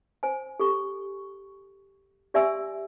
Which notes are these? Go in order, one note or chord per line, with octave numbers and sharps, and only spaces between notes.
C5 G#5
G4 A4 C#6
G4 D5 E5 G#5 C6 E6